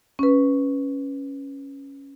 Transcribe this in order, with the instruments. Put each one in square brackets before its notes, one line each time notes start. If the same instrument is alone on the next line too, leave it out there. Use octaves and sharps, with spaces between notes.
[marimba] C#4 B4